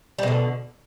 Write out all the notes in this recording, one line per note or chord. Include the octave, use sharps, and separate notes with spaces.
B2 D3 G3